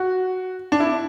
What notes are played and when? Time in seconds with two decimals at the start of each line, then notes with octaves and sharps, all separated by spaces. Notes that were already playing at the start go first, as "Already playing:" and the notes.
Already playing: F#4
0.72 D4
0.80 E4